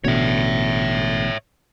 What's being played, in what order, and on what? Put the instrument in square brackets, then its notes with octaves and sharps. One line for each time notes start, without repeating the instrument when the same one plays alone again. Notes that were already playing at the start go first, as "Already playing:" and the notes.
[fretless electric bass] A1 B2 D3 [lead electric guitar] C#5 E5